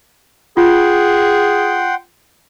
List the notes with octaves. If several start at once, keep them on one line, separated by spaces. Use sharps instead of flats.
F4 G#4 F#5 G5 C6